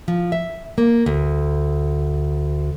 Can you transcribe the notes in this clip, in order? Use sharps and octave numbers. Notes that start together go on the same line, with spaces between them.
F3
E5
A#3
D2